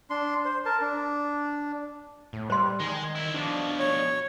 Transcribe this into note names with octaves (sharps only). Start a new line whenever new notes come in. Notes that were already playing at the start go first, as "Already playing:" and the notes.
D4 C6
C5
A#4 A5
D4
A2
G3 C5 C6
D#3 G#3
C4 E4
B2 F3 D4
C#5